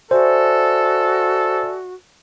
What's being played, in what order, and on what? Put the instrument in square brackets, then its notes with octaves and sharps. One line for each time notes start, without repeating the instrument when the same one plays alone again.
[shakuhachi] F#4 [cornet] A4 [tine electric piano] C5 [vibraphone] D5 E5 G#5